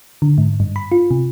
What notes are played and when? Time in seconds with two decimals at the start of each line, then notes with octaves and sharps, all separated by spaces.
0.22 D3
0.38 G#2
0.60 G2
0.76 B5
0.92 F4
1.11 C3